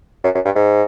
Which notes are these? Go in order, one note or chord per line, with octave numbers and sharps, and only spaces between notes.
F#2
F#2
G2
G#2